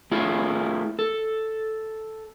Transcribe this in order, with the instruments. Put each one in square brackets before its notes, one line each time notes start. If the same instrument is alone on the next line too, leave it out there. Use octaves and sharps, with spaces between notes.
[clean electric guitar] A3 E4 F4 G#4
A4